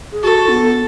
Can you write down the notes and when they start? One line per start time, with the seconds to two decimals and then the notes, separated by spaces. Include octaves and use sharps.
0.12 G#4
0.23 F#4 A4
0.48 B3